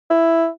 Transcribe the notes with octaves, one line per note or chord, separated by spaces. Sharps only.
E4